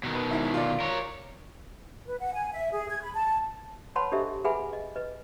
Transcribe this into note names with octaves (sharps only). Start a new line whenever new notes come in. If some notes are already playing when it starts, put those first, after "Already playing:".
B2 D#3
B4
G#2 E4 E5
F4 D5
A#4 C#5
B4
F#5
G#5
E5
G#4
G#6
B5
A5
B4 C#5 F#5 A5 B5 C6
D4 G4 A4 C5 D#5 E5
G#4 B4 E5 F#5 G#5 B5
D#5
B4 D#5